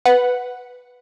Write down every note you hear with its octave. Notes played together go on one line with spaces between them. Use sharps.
B4 F#5